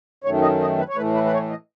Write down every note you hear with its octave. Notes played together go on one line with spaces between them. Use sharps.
F#2 D#3 A3 C#5
D#5
D#5
B4
C#5
A2 E3 A3 B4
B4
B4
C#5
D#5